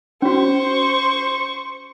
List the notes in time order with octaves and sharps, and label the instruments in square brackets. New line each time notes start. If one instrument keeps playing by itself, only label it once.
[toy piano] C#4 F#4 [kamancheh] C5 C#6